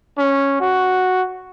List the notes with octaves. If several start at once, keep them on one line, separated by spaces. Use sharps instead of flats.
C#4
F#4